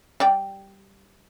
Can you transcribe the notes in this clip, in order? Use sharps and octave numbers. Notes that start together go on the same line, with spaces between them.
G3 D5 G5